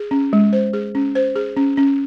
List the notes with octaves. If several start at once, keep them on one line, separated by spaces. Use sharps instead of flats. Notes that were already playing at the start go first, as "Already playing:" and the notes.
Already playing: G#4
C#4
G#3
C5
G#4
C#4
C5
G#4
C#4
C#4